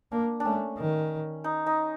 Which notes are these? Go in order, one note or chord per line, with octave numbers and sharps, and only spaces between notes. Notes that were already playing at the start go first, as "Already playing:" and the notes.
A#3 D4
D4
A3 C#4
D#3
D#4
D#4